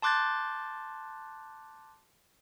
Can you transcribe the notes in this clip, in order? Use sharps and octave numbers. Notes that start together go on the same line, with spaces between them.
A5 C6 D6 F#6 G6 A6